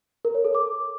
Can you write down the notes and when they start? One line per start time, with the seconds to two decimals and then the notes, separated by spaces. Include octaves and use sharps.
0.25 A#4
0.35 C#5
0.45 A4
0.55 D6